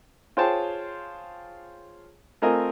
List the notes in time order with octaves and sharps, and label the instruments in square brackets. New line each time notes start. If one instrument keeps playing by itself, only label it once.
[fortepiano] F4 G#4 C5 C#5 G5 A5
A3 C4 F4 A#4 D#5 G#5